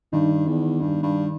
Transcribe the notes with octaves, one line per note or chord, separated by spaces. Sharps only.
G2 D#3 D#4
E2
G2
G2